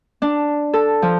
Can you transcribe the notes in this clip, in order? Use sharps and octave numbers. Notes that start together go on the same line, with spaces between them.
D4
A4
F3